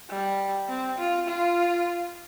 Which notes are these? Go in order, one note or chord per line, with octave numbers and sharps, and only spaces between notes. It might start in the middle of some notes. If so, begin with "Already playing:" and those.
G3
C4
F4
F4